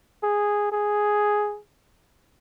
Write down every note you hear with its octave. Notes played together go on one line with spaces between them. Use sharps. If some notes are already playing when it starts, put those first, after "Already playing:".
G#4
G#4